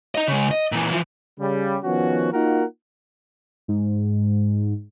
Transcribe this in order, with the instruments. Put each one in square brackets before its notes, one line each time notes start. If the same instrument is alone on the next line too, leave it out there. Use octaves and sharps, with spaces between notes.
[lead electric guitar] D#4 D#5
C#3 G#3
D#5
A#2 E3
E3 F3
[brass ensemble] C#3 G3
D#3 F3 B3 C#4 F#4
A#3 D#4 F4 F#4 A#4 F#5
[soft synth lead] G#2